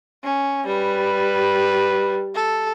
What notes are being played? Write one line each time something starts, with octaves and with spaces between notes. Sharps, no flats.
C#4
G3 B4
A4